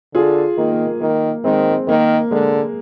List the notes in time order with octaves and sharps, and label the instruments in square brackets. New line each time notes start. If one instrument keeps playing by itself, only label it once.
[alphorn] D3 [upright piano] F4 G#4
[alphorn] D#3 [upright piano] A#3
[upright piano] A#3
A#3
[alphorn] D#3 [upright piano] A#3
[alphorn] D#3 [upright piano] G#3 C4
[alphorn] D#3 [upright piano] A#3
[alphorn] D3 [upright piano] G#3